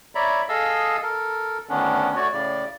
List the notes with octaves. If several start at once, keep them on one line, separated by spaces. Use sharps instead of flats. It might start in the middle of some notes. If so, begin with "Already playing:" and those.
C#5 D5 E5 A#5 B5
G#4 A4 D#5 F5 E6
A4 A#4
D2 D#3 B3 C#4 D4
A3 F#4 C#5 D5
A2 C#3 D5